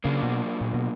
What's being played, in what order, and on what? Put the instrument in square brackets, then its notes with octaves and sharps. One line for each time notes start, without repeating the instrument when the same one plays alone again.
[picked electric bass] C#3 [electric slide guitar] F#3 A#3 D4 F4
[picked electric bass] B2
A#2
B2